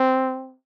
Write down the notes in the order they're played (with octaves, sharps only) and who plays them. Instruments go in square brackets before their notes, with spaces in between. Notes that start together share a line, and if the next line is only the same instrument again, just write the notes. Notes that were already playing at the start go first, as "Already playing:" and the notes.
Already playing: [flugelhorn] C4